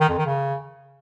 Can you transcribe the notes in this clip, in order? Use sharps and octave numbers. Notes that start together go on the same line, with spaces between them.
D#3
F2
D#3
C#3